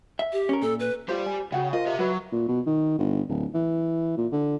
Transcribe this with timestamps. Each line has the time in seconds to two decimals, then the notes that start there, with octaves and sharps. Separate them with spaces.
0.19 E5
0.33 G4
0.49 C#4 A#4
0.62 A#2 A4
0.80 B4
1.09 F4 G4 C5 D5
1.26 G#5
1.52 C#3 F#4 F#5 G5
1.73 F4 A#4 C5 D#5
1.86 G4 E5
1.99 F#3 F#4 B4 E5
2.32 A#2
2.48 B2
2.66 D#3
2.98 G1
3.29 D1
3.54 E3
4.17 A#2
4.32 D3